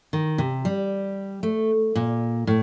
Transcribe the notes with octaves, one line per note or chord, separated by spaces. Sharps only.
D#3
C3
G3
A3
A#2
A2